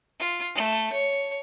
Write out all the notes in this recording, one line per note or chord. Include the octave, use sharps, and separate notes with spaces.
F4
A3
C#5